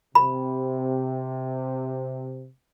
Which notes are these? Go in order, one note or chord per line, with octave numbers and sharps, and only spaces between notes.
C3 B5